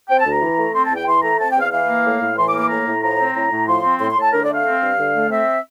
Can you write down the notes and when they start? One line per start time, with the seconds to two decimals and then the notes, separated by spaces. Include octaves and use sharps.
0.09 C4 G5
0.19 A5
0.25 D2
0.31 A#5
0.41 E3
0.57 A3
0.74 C4 C6
0.85 A5
0.91 E2 G5
1.06 E3 C6
1.22 A3 A#5
1.39 C4 A5
1.50 G5
1.55 E2
1.61 F5
1.72 E3 F5
1.88 A#3
2.04 A2
2.21 A2
2.37 E3 C6
2.47 D6
2.53 A#3
2.58 D6
2.69 A2 A#5
2.86 A2
3.02 F3 A#5
3.18 C4
3.34 A2 A#5
3.50 A2
3.67 F3 C6
3.83 C4
3.99 A2 C6
4.10 C6
4.16 A2
4.21 A5
4.32 D3 A#4
4.43 A3 D5
4.54 F5
4.64 C4
4.81 G2
4.97 D3
5.14 A3
5.30 C4 E5